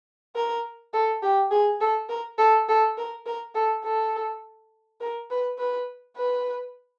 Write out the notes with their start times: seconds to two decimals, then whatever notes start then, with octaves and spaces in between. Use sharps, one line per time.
0.36 A#4
0.93 A4
1.22 G4
1.51 G#4
1.81 A4
2.09 A#4
2.38 A4
2.68 A4
2.98 A#4
3.26 A#4
3.55 A4
3.84 A4
5.01 A#4
5.30 B4
5.58 B4
6.17 B4